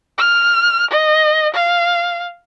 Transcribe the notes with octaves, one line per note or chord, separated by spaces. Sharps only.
F6
D#5
F5